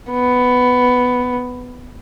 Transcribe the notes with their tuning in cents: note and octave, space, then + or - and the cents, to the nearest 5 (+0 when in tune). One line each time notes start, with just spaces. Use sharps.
B3 +10